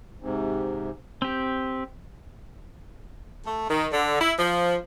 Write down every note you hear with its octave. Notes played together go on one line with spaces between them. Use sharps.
G#2 C3
C4 G4
A3
D#3
D3
E4
F3